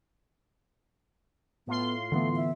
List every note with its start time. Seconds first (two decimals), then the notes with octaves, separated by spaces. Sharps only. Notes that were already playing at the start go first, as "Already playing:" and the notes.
1.67 A2 B3 F4 C6
2.12 D3 E3 A3 B3
2.36 E5